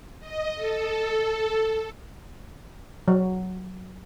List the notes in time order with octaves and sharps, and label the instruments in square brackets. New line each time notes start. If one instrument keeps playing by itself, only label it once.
[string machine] D#5
A4
[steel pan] F#3